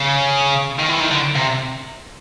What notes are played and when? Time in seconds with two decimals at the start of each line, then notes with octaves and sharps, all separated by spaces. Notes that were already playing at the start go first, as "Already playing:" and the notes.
Already playing: C#3
0.79 D#3
0.89 E3
1.00 D#3
1.11 D3
1.35 C3